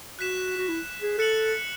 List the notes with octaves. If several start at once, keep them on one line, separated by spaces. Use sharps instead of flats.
F#4 F#6 B6 E7
F#4
E4
G#4
A4 F#6 C#7 F#7